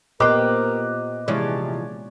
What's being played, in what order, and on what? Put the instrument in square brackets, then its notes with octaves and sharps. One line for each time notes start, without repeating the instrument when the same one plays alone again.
[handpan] A#2 B3 [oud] G4 C5 [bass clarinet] A#4 [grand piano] D#5 D6 F#6
[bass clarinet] C3 [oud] E3 F3 [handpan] G#3 C#5 D5